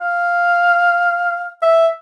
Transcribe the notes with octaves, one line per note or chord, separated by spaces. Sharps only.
F5
E5